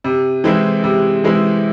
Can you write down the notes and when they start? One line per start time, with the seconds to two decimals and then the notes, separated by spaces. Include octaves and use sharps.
0.04 C3
0.44 E3 G#3 C4 E4
0.84 C3
1.24 E3 G#3 C4 E4